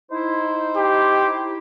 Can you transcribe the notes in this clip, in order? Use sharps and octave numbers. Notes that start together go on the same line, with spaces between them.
D#4 E4 C5
G4